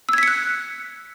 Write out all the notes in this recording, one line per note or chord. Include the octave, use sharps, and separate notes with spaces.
E6 F#6 G#6 B6 C#7